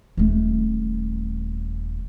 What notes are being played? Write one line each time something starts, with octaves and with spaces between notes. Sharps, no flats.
D#1 A3